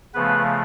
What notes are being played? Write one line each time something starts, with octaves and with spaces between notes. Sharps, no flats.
C#3 F3 A3 B3 B4